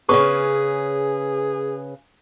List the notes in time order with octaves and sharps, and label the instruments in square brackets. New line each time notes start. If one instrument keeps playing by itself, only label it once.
[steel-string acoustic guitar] C#3 C#4 B4 [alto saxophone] G#4 [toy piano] C#6